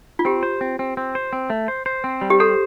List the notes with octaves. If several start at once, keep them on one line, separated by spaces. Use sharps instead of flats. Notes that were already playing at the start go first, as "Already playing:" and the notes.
F4
C4 G4
C5
C4
C4
C4
C5
C4
A3
C5
C5
C4
G3
G4
A4 C5